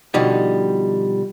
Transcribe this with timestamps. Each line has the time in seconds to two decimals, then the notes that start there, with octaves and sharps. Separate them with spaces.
0.14 B2 D3 F3 G3 D#4